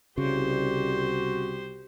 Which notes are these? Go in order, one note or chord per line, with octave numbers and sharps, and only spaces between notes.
C2 C#3 F#4 G4 C5